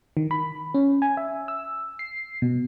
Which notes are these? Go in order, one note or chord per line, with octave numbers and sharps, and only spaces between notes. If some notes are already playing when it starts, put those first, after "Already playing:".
D#3
B5
C#4
G#5
E5
E6
C7
B2